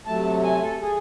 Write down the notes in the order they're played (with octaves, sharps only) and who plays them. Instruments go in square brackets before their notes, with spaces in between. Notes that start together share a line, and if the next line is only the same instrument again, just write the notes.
[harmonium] C3 F#3 A3 A5
G#5
A4
G#4